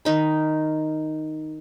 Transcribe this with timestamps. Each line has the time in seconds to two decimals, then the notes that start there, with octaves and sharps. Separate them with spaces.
0.05 D#3 D#4 B5